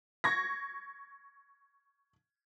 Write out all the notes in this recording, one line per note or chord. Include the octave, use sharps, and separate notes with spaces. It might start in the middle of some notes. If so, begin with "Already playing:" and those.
C#6 G#6 A#6